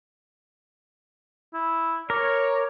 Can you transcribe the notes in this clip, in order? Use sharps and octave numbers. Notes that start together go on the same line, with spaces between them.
E4
A#4 C#5 D6